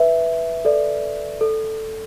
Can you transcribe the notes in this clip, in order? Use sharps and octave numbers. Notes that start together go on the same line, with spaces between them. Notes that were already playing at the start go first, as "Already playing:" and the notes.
Already playing: B4 E5
A4 D5
A4